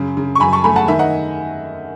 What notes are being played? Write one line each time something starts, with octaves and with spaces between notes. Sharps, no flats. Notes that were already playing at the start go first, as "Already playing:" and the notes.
Already playing: F#2 C#3
C#3
C#6
F#2 G#5 B5
A5 C#6
A3 G#5 B5
F#5 A5
D#3 E5 G#5
D#5 F#5